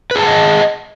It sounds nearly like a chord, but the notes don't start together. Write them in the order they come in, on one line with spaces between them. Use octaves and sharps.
B4 G#4 A5 F#5 D#5